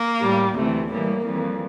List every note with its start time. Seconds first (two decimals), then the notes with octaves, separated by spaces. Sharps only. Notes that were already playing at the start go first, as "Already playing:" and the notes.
Already playing: A#3
0.21 A2 G3
0.55 D2 C3 E3 A3
0.90 A2 E3 G3 A#3
1.26 F2 E3 G3